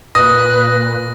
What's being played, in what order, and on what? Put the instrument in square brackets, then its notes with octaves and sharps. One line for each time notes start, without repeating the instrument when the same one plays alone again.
[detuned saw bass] A#2 [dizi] B4 [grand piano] D#6 [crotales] A#6